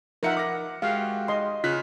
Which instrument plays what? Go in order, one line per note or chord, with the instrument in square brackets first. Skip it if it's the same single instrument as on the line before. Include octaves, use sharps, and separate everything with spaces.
[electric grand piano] F3 D#4 C#7 [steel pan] A#4 E5 F#5
[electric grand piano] D6 F6 A#6
[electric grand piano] G#3 F#4 G4 [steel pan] F5
[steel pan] D#5 C6
[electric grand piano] C#3 F#6 B6 [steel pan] F4